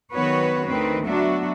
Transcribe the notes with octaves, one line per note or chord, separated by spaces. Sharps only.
D#3 F#3 B3 F#4 B4 C#5
D2 D#3 C4 B4
F#3 B3 D4 F#4 E5